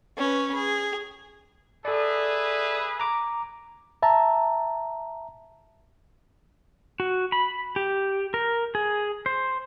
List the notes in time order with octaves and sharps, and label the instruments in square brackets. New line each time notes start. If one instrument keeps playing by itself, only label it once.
[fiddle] C#4 B4
G#4
[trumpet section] G#4 B4 E5 [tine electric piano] A4 D5
[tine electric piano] A#5 D6
[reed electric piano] E5 A5 A#5
[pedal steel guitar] F#4
B5
G4
A#4
G#4
C5